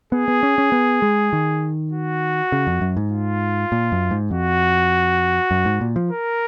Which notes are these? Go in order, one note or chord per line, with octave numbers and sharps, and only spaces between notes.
B3 G#4
B3
C#4
C#4
B3
G#3
D#3
F#4
C#3
F2
F#2
G#2
F4
A#2
F#2
G#2
F2 F#4
F#2
G#2
A#2
F3
A#4